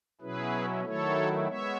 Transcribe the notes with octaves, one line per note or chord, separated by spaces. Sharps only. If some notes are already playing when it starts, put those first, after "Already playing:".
B2 F#3 C#4 E4 G#4 B4
D#3 F#3 A3 E4 A4 C#5
G#3 B3 C#5 E5